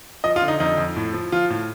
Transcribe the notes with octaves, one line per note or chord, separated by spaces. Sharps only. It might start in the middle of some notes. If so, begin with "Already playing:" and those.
F3 D#5
F4
D3
D#4
F2 D#4
F2
A2
F3
F3 F4
A2